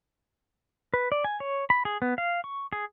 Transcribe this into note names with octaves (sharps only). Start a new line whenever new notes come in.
B4
D5
G#5
C#5
B5
G#4
B3
F5
C#6
G#4